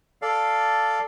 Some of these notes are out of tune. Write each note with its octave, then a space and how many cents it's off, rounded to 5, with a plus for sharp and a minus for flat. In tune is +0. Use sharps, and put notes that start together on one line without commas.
A4 +0 D5 +0 F5 +0